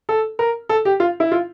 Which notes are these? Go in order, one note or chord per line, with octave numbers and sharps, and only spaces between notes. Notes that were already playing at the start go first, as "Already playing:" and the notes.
A4
A#4
A4
G4
F4
E4
F4